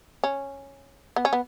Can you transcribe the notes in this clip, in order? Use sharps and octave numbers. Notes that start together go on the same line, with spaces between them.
C#4
B3
C#4
B3